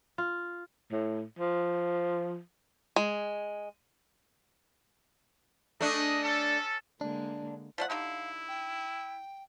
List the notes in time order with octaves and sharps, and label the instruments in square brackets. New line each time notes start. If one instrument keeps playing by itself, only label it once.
[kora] F4
[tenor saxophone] A2
F3
[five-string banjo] G#3
[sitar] A3 D4 [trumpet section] G#4 D#5
[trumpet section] C#4 A4
[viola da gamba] D3 G#3 A#3 [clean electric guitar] D4
[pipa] F3 A3 F#5 [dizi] D5
[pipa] D3 D#4 G4 [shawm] E4 [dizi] F5
[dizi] G5